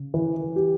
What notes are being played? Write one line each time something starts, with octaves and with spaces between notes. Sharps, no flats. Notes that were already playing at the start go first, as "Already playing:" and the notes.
Already playing: C#3
E3
G4